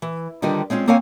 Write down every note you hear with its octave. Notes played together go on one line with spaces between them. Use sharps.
E3
D3 D#3 G3 F4 B4 D#5
G#3 C4 C#4 F4
A#3 C4 C#4 C#5 F5 G#5